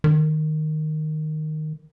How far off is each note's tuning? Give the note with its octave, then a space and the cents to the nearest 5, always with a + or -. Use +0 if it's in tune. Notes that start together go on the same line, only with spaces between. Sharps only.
D#3 -10